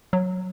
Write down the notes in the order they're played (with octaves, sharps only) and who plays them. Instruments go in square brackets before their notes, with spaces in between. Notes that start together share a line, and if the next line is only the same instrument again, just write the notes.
[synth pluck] F#3